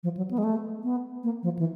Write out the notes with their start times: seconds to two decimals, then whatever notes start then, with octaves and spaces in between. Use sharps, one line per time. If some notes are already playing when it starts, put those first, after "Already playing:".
0.03 F3
0.17 F#3
0.31 B3
0.38 G#3
0.44 A3
0.83 B3
1.23 A#3
1.43 F3
1.59 E3